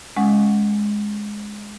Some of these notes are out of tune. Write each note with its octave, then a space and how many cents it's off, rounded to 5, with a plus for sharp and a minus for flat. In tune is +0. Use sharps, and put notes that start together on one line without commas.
G#3 +0 C#4 +0 F#5 +0